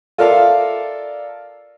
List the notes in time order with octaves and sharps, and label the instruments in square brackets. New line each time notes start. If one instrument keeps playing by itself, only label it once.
[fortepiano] F4 A4 A#4 D5 E5 F5